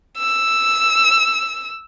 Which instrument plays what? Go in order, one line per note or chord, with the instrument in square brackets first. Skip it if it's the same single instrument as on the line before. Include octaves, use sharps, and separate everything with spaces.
[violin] E6